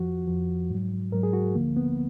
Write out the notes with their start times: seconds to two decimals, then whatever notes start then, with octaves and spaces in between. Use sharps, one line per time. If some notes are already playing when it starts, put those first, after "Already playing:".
Already playing: F2 F3 F#4
0.27 F2 F3
0.70 G#2 F#3
1.12 G#2 F#3 A#4
1.23 G#4
1.33 F#4
1.55 D2 D3 F3 A#3
1.77 B3